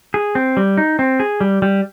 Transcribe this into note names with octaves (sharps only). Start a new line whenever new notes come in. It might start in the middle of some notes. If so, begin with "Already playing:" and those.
G#4
C4
G3
D#4
C4
G#4
G3
G3